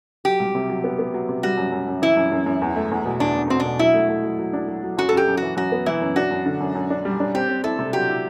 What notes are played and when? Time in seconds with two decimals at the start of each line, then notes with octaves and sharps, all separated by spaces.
0.25 F#3 G4
0.40 C2
0.55 C3
0.70 F#3
0.84 B3
0.99 B3
1.14 F#3
1.29 C3
1.43 G3 F#4
1.57 F#2
1.72 F#2
1.88 F#2
2.02 E3 E4
2.17 F#2
2.32 F#2
2.46 F#2
2.62 E2
2.76 A3
2.91 E2
3.05 B2
3.20 E2 D4
3.35 E2
3.50 B2 C4
3.60 D4
3.65 B2
3.79 F#3 E4
3.94 A3
4.09 A3
4.24 F#3
4.39 F#3
4.53 D4
4.68 F#3
4.83 F#3
4.97 F#2 F#4
5.09 A4
5.13 F#2 G4
5.28 F#2
5.37 F#4
5.43 E3
5.57 F#2 F#4
5.72 B3
5.86 E3 E4
6.01 F#2
6.16 D4 F#4
6.31 F#2
6.46 D3
6.61 F#2
6.75 F#2
6.90 D4
7.05 G3
7.20 D4
7.35 C4 G4
7.49 C4
7.64 E4 A4
7.79 C3
7.93 F#3 G4
8.08 E4